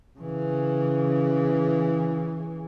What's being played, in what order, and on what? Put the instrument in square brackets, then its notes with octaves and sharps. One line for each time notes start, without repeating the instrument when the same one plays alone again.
[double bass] C#3 E3